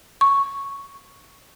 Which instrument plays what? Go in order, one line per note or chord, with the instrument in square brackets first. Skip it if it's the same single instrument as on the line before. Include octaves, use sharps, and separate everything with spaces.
[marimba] C#6